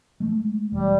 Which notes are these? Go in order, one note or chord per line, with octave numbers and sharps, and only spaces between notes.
G#3 A3
E1 G3